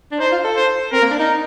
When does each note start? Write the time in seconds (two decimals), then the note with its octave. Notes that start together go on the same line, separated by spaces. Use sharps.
0.12 D4
0.20 D#4 C5
0.32 F4
0.44 A4
0.57 C5
0.92 C4 A#4
1.02 A#3
1.11 D4
1.19 D#4